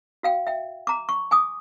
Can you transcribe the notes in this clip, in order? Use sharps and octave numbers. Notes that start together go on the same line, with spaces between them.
F#4 F5 G5
E5 G5
A#5 D6
C#6
G#5 D6 D#6